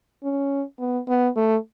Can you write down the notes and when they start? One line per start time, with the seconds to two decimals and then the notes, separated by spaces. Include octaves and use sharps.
0.23 C#4
0.79 B3
1.08 B3
1.36 A3